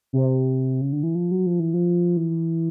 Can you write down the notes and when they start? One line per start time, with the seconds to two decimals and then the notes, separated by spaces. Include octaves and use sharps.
0.13 C3
0.81 C#3
0.93 D3
1.03 E3
1.15 F3
1.31 F#3
1.46 F3
1.60 E3
1.74 F3
2.17 E3